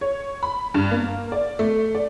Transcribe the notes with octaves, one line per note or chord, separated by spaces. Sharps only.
C#5
B5
G2
A#3
D5
A3
D5